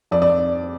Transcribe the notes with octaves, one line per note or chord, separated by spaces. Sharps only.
F2 D5
D5